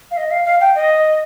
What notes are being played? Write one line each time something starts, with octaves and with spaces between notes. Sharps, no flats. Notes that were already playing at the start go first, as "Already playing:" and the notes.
F5
D#5
F5
F5
G5
D#5